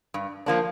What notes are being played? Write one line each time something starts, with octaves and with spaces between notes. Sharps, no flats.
G2
F3 A#3 D4